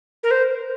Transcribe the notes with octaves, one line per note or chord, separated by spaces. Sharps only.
A#4
C5